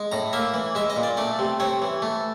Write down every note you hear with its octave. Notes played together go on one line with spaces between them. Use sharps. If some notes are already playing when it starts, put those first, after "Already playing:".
Already playing: G#3
A2 A#5
A#3 E5
E3
G#3 E5
D#5
A#2
D5
A3 D5
C3
C4 C#5
E3
A3